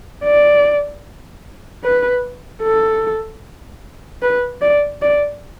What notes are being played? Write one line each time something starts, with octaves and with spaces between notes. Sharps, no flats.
D5
B4
A4
B4
D5
D5